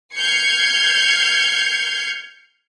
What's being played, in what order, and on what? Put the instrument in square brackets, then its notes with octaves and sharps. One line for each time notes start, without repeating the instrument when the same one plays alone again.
[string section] F6 G6 G#6 C7 C#7